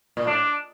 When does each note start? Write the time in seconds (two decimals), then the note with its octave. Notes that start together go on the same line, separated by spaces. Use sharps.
0.17 A#2
0.26 A2 D4